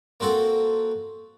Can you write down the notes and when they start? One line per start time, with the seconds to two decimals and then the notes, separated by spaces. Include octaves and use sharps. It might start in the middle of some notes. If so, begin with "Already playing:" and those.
0.20 A#3 C4 F#4 A4